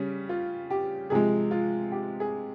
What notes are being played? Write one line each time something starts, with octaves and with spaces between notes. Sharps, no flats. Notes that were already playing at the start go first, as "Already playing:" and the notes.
Already playing: C#3 G3 C#4
F4
G4
C3 F3 G#3 G#4
F4
G4
G#4